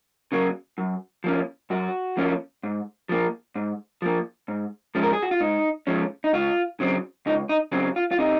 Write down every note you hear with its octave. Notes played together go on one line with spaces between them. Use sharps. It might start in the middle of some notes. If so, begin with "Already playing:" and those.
C#3 F#3 A#3
F#2
F3 A#3 C#4
F#2 F#4
F3 A#3 C#4
G#2
F3 A#3
G#2
F3 A#3
G#2
F3 G#3 C#4
A#4
G#4
F#4
F4
G#2 D#4
F3 G#3 C#4
D#4
C#2 F4
C#3 F#3 C4
C#2 D#4
D#4
C#3 F#3 C4
F4
F4
C3 D#4